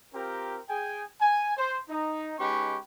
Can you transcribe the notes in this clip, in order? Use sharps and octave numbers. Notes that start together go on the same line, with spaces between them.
C4 F4 G4 A#4
G#4 G5 G#5
G#5
C5
D#4
G#3 C#4 D#4 G4 B4 C#6